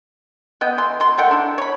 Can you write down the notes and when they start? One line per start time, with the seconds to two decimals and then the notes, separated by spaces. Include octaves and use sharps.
0.61 B3 D#5 G5
0.78 E3 C6
1.00 B2 C6
1.18 D#3 A3 F#5 G5
1.31 D4 E4
1.58 C#5 B5